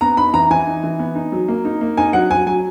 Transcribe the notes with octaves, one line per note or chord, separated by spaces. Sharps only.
B3 A#5
D#4 B5
E3 A#5
E3 G#5
D#4
E3
B3
D#4
F#3
A#3
D#4
A#3
D#4 G#5
F#3 F#5
F#3 G#5
F#3 G#5